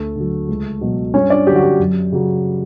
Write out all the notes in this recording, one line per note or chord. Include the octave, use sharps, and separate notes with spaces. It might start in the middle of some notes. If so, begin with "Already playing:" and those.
Already playing: D2 A3 A4
D3 F#3
C#2
B2 F#3
G2 C#4 C#5
D4 D5
D3 F#3 G4
F#4
G4
F#2
C#3 F#3